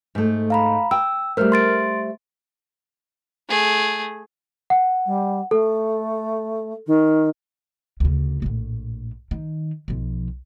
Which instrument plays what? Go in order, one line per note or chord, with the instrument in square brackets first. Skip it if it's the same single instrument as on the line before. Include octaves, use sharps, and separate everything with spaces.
[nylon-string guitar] G#2 A3
[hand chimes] F5 A#5 B5
[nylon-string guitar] G5 [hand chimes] E6
[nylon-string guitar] G3 A3 C5 [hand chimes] A#4 F6
[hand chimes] C6 A6 D7
[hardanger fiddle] A3 G#4
[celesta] F#5
[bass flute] G3
[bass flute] A3 [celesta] A4
[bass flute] D#3
[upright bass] D2 C#3
A#1 A2
D#3
B1 F3